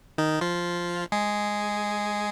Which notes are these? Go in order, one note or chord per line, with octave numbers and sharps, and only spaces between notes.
D#3 D#4
F3 F4
G#3 G#4